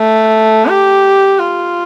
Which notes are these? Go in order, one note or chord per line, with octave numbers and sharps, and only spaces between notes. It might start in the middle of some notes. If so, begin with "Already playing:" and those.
Already playing: A3
G4
F4